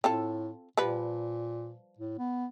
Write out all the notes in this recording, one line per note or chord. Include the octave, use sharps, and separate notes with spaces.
A2 C4 F4 A4
A#2 F3 G3 B4
A2
B3